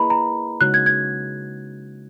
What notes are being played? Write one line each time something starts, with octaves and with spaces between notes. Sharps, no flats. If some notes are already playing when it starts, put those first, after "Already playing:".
Already playing: A#3 E4 G#4 B4 D#5 A#5 B5
A#5
C#3 G#3 D#4 F#4 C#5 F#6
G#6
G#6